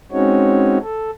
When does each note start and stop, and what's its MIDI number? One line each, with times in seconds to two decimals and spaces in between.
0.12 0.78 56
0.12 0.78 60
0.12 0.78 61
0.12 0.78 63
0.12 0.78 66
0.12 0.78 73
0.82 1.11 69